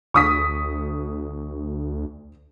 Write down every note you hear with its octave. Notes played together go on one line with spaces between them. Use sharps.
D2 C#6 D#6 B6